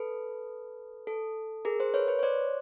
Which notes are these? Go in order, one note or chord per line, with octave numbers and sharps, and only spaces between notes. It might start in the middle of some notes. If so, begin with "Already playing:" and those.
Already playing: A4 B4
A4
G#4 A#4
A#4 C5
B4 C#5
B4 C#5
C#5
C5 D5